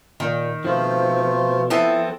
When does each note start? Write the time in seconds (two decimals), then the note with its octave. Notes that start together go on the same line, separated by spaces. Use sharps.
0.20 A#2 D#3
0.65 B2 F3 A3 C4 F4
1.70 B3 C4 E4 A4